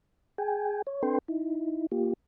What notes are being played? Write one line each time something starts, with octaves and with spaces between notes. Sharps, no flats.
G#4 G5 G#5
C#5
C4 D4 A4 B4 G5 C6
D#4 E4
A#3 F4 G4